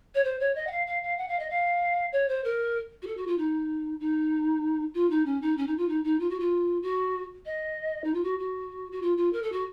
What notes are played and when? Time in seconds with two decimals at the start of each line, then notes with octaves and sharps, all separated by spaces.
0.14 C#5
0.24 C5
0.40 C#5
0.55 D#5
0.67 F#5
0.71 F5
0.86 F5
1.02 F5
1.17 F#5
1.28 F5
1.39 D#5
1.50 F5
2.12 C#5
2.28 C5
2.44 A#4
3.02 F#4
3.07 A4
3.17 F#4
3.27 F4
3.38 D#4
4.00 D#4
4.94 F4
5.10 D#4
5.25 C#4
5.41 D#4
5.57 C#4
5.67 D#4
5.77 F4
5.88 D#4
6.04 D#4
6.19 F4
6.29 F#4
6.39 F4
6.82 F#4
7.45 D#5
8.04 D#4
8.13 F4
8.23 F#4
8.39 F#4
8.91 F#4
9.02 F4
9.17 F4
9.32 A#4
9.42 A4
9.52 F#4